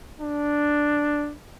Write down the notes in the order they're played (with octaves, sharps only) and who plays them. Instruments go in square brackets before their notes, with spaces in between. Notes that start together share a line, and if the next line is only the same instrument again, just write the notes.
[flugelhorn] D4